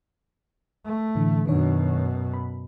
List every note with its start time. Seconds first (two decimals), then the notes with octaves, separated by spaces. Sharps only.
0.86 A3
1.15 A2 D3 E3
1.47 F#2 B2 D#3 D4 C#5
2.34 B5